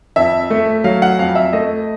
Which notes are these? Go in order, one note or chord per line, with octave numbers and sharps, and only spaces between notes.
F2 E5
A3
F#3 F5
F#5
F2 F5
E5
A3 D#5